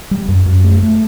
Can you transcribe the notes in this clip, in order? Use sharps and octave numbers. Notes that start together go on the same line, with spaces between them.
G3
F#2
F#2
A3
A3